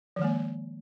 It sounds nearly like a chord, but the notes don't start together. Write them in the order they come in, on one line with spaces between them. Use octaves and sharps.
F3 D#3 G#3 A#3